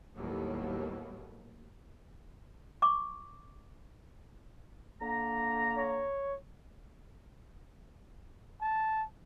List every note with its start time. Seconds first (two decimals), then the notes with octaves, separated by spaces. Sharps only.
0.16 D#2 A2 F#3 G3 A#3 B3
2.82 C#6 D6
5.00 D3 A#3 A#5
5.78 C#5
8.62 A5